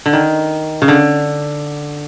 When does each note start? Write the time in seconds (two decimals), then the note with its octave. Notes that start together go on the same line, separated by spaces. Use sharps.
0.06 D3
0.13 D#3
0.82 C#3
0.88 D3